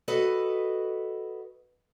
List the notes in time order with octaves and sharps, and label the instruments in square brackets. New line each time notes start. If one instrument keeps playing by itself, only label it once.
[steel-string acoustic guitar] F#4 A4 B4 D#5